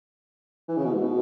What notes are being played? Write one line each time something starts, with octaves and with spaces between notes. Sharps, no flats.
E3
C#3
B2
G#2
B2